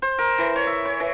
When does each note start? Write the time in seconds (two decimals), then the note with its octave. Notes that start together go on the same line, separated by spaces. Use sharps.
0.02 C5
0.18 A#4
0.38 E3
0.56 C#5
0.67 E5
0.85 C#5
1.00 E3